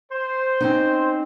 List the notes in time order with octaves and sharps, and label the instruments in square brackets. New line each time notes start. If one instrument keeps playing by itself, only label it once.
[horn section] C5
[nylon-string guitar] C4 C#4 D#4